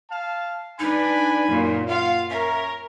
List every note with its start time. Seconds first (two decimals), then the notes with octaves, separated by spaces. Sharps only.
0.10 F5 A5
0.80 D4 D#4 B4 G#5 B5
1.47 F#2 A#2
1.89 F4 F5 F#5
2.30 C#4 A#4 E5